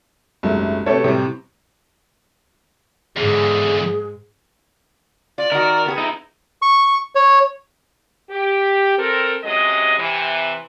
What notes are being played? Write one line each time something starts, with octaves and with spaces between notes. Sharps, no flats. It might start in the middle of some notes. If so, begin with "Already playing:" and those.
F#1 C2 G#2 F#3 A3
C3 A3 F#4 G4 A4 B4 C#5
A2 C3 G3
E2 G#2 D3 G#4
F4 D5
D#3 F#4 A#4
B3 F#4 G#4
D#4 E4
C#6
C#5
G4
C4 A4 A#4
C3 F#3 G#3 C#4 D#5
C3 E3